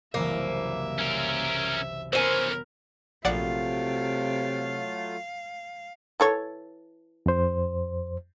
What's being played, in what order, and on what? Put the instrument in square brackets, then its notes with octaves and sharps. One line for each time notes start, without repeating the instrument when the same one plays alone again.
[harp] F#1 C2 E3 [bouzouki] A#3 [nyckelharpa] E5
[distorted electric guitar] C#4 A#4
[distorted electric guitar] E3 C#4 [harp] B3 [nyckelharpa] A#4 [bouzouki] C5 G#5
[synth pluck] A#1 D5 F#5 [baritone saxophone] C3 [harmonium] F#3 A3 F4 [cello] F5
[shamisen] E3 A4 C#5
[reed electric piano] F2 C5